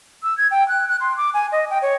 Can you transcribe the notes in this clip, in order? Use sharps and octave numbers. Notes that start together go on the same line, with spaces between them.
E6
G#6
G5
F#6
F#6
C6
D6
G#5
D#5
G5
C#5